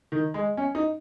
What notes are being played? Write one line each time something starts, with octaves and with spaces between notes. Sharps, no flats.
D#3
G#3
C#4
D#4